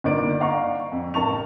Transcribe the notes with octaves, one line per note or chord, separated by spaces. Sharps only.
G1 A#3 D#4 D5 D7
D5 D#5 F5 F#5 A#5 C#6
F2
A1 A#4 A5 C#6 F7